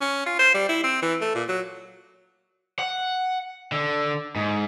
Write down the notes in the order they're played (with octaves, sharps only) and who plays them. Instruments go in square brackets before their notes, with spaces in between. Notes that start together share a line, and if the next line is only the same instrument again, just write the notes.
[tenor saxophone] C#4
F4
C5
G3
E4
C4
E3
A3
A#2
F#3
[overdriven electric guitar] F#5
D3
G#2